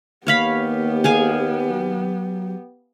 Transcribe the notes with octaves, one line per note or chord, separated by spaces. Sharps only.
D#2 A#3 B3 G4 C#5 F5 B5
G#4 F5 G#5
F#3